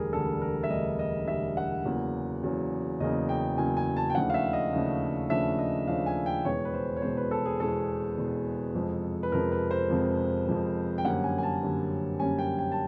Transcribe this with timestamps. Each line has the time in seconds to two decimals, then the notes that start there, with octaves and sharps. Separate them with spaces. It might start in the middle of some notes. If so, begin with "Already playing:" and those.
Already playing: E1 D2 D3 G3 G#4 A#4
0.13 E1 D2 D3 G3 A4
0.42 A#4
0.63 E5
0.70 E1 D2 D3 G3 D#5
0.99 D#5
1.28 E1 D2 D3 G3 E5
1.57 F#5
1.85 E2 C#3 F#3 A#3
2.43 E2 C#3 F#3 A#3
3.00 E2 C#3 F#3 A#3 D#5
3.29 G5
3.57 E2 C#3 F#3 A#3 G#5
3.77 G#5
3.97 A5
4.10 G5
4.15 D#2 C#3 F3 A3 D4 F#5
4.30 F5
4.34 E5
4.53 D#5
4.73 D#2 C#3 F3 A3 D4
5.30 D#2 C#3 F3 A3 D4 E5
5.59 D#5
5.87 D#2 C#3 F3 A3 D4 F5
6.06 G#5
6.26 G5
6.45 E2 B2 G#3 B3 C#5
6.65 B4
6.74 C5
6.97 C#5
7.02 E2 B2 G#3 B3 C5
7.17 B4
7.31 A4
7.46 G#4
7.60 E2 B2 G#3 B3 A4
8.18 E2 B2 G#3 B3
8.75 F2 C3 F3 G#3
9.23 B4
9.32 F2 C3 F3 G#3 A#4
9.52 B4
9.71 C5
9.90 F2 C3 F3 G#3
10.47 F2 C3 F3 G#3
10.98 G5
11.05 F#2 D3 G3 A#3 C#4 F#5
11.24 G#5
11.38 G#5
11.43 A5
11.62 F#2 D3 G3 A#3 C#4
12.20 F#2 D3 G3 A#3 C#4 G#5
12.39 G5
12.59 G5
12.72 A5